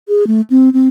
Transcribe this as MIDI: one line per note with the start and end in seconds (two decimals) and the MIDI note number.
0.08 0.27 68
0.27 0.41 57
0.50 0.69 60
0.73 0.88 60